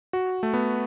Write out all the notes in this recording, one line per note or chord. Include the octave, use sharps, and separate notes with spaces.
F#4
A3
B3